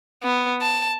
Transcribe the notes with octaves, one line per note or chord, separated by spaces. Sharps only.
B3
A5